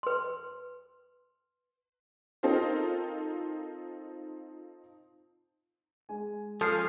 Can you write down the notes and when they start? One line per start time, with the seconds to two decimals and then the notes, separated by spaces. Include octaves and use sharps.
0.03 B4 C6
2.43 C4 D#4 F4 A4 A#4 C5
6.09 G#3 G#5
6.61 F3 C#4 G#4 A4 F5